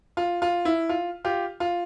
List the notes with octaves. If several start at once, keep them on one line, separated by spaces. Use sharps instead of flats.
F4
F4
E4
F4
F4 G4
F4